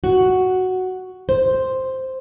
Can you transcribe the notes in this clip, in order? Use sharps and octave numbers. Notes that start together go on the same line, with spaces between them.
F#4
C5